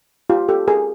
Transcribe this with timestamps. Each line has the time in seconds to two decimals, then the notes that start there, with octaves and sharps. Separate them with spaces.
0.30 F4 G4
0.49 G4 A4
0.68 G#4 A#4